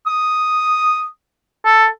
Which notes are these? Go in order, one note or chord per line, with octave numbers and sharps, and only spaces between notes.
D#6
A4